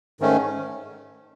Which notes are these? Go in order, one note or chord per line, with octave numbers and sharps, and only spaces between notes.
G#2 D#3 A3 C#4